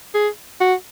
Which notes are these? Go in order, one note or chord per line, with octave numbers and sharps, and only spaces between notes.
G#4
F#4